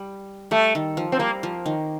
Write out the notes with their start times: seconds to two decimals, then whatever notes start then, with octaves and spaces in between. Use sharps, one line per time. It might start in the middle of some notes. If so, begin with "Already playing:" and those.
Already playing: G3
0.51 G3 A3
0.75 D#3
0.97 F3
1.12 C4
1.19 G3 A#3
1.43 F3
1.66 D#3